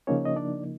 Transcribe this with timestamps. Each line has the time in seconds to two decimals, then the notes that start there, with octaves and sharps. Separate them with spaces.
0.07 C#3 F3 A#3 C#4 D#4 C#5
0.25 D#5
0.36 D4 D5